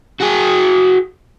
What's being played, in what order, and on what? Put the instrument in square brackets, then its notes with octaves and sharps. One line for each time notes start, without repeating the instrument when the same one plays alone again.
[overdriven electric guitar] F#4 G#4